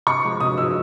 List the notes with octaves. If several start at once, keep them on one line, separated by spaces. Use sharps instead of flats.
C3 C#6
F3 G#3
C3 D#6
F3 G#3 E6